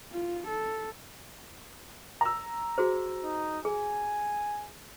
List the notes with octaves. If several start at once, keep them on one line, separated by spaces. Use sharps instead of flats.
F4
A4
A#5 E6
F#4 G#4 C5
D#4
G#4 G#5